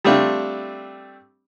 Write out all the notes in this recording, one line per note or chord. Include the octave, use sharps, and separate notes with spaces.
G3 A3 C4 D4 F4